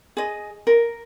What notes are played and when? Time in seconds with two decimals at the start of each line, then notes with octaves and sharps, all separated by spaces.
0.17 G#4 D#5
0.67 A#4